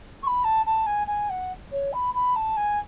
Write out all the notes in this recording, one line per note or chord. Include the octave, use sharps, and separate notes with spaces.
C#6
B5
A5
A5
G#5
G#5
F#5
C#5
B5
B5
A5
G#5